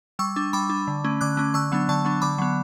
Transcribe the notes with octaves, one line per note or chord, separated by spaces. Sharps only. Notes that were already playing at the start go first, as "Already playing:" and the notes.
G3 C#6 E6
D4
G3 B5 D6
D4
D3
A3 C#4
D3 D6 F#6
A3 C#4
D3 C#6 E6
F#3 B3 D4
D3 A5 C#6
F#3 B3 D4
D3 B5 D6
F#3 B3